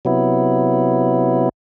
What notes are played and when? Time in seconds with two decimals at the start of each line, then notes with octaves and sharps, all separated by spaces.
0.05 C3 F#3 B3 E4